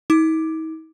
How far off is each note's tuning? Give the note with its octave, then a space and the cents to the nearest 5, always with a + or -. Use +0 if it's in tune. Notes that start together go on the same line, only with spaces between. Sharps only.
D#4 +45 D6 +10